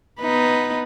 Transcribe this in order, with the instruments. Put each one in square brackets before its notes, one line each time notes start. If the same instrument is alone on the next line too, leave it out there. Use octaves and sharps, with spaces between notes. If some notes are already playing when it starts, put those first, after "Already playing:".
[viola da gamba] B3 D#4 B4